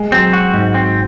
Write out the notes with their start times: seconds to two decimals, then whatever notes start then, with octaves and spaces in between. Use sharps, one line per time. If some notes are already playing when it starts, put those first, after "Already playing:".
Already playing: G#3
0.12 F#3 C4
0.33 F#4
0.54 G#2
0.74 C4